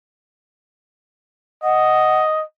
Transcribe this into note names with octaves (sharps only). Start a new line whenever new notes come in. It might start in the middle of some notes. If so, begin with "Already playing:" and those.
D#5 F#5